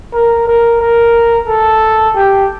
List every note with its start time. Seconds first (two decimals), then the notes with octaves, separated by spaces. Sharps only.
0.14 A#4
0.48 A#4
0.81 A#4
1.48 A4
2.15 G4